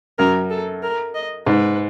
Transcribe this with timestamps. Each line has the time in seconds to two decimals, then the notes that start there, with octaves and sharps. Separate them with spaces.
0.19 F#2 A#4
0.50 A4
0.83 A#4
1.15 D#5
1.46 G#2 B4